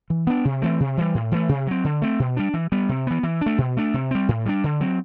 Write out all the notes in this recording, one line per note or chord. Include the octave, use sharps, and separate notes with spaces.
E3
B3 D4
C3
E3 A3 C4
C3
E3 G3
A2
E3 A3
C3
F#3 C4
D3
A3 C4
B2
G3 D4
E3
G3 B3
C3
E3 B3
E3
A3 D4
B2
A3 D4
C3
G3 C4
A2
G3 B3 D4
D3
F#3 C4